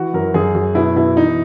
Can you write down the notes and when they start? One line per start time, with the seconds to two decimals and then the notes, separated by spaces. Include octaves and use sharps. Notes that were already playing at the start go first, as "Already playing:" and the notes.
Already playing: E3 F#4
0.14 F#2 A#4
0.34 F#2 G#4
0.55 F#2
0.75 B2 E4
0.96 B2 E4
1.16 E3 D#4